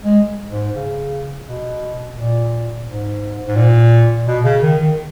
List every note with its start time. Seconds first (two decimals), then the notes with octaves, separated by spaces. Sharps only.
0.04 G#3
0.51 G#2
0.75 C#3
1.45 B2
2.16 A#2
2.86 G#2
3.47 G#2
3.56 A#2
4.27 B2
4.44 C#3
4.62 D#3
4.80 D#3